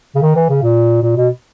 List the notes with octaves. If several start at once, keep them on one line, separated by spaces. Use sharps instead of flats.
C#3
D#3
E3
C#3
A#2
A#2
B2